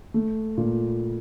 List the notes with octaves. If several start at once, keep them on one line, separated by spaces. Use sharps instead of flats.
A3
A#2